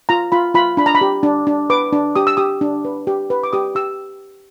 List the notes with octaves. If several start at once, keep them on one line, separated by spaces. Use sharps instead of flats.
F4 A#5
F4 B5
F4 B5
D4 B5
A#5
B5
G4
D4
D4
B4 D6
D4
G4 D#6
E6
G4 D#6
D4
B4
G4
B4
D6
G4 D#6
G4 E6